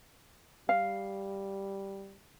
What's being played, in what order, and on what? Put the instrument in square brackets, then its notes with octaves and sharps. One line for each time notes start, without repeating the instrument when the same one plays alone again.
[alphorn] G3 [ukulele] F5